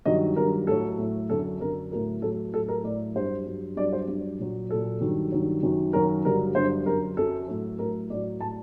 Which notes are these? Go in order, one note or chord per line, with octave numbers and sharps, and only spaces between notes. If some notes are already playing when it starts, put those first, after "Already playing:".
G2 D#3 F#3 D#5
G2 D#3 F#3 A#4
A2 F#3 A4
A2 F#3
F#2 D3 F#3 A4
F#2 D3 F#3 A#4
A2 F#3 A#4
A2 F#3 A4
A2 F#3 A4
A#4
A2 F#3 D5
G2 F#3 C5
G2 F#3
G2 F#3 D5
C5
G2 F#3
A#2 F#3
A#2 F#3 A4
G2 D#3 F#3
G2 D#3 F#3
F#2 D#3 F#3
F#2 D#3 F#3 A#4
G2 D3 F#3 A#4
G2 D3 F#3 C5
F#2 F#3 A#4
F#2 F#3 A4
A2 F#3
A2 F#3 A#4
A2 F#3 D5
A2 F#3 A5